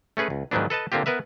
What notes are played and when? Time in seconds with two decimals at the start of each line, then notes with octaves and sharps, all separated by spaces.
0.17 A3 C#4 G#4 B4
0.30 C#2
0.51 G#2 D#3 F3 F#3 B3 D4
0.70 A4 B4 D#5 A5
0.92 D3 A#3 C4 F4 G4
1.06 B3 A#4 B4 E5